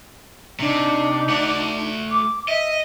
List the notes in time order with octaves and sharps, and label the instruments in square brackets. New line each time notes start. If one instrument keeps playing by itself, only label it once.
[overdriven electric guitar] C3 [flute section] D4 D#4
[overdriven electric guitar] A3 F#5
[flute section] D6
[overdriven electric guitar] D#5 [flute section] E5